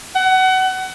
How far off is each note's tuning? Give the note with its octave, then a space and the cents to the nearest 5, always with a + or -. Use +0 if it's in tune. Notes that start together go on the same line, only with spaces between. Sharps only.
F#5 +25